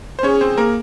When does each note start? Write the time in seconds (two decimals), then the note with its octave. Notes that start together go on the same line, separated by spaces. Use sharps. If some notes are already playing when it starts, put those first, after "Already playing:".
0.19 C5
0.23 C#4 G#4 C#5
0.41 C4 C5
0.58 A#3 A#4